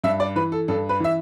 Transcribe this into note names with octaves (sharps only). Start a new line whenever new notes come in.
G2 E5
D5
E3 B4
A4
G2 A4
B4
E3 E5